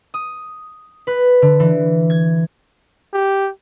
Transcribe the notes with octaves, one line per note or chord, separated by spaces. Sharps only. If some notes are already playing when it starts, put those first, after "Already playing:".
D#6
B4
D3
E3
G#6
G4